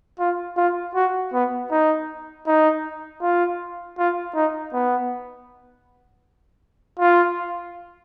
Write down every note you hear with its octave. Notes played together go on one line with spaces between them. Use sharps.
F4
F4
F#4
B3
D#4
D#4
F4
F4
D#4
B3
F4